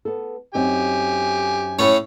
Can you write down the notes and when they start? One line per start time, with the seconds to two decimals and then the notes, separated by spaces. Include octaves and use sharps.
0.05 B3 A4
0.54 F#2 C4 D#4 G4 G#5
1.79 A2 C#4